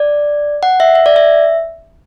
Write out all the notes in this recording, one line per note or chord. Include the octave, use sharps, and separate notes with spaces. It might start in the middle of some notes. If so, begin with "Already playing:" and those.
Already playing: D5
F#5
E5
E5
D5
E5